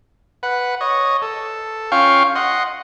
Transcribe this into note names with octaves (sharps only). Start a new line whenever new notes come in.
B4 F#5
C#5 D#5
A4
C#4 F4 F5 G5 C#6
D#5 F#5 C6